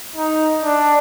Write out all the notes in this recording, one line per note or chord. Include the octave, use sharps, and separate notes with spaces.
D#4
D4